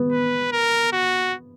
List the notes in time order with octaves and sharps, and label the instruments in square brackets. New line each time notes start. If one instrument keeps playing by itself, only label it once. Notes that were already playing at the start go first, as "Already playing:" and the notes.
Already playing: [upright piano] B3
[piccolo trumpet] B4
A#4
F#4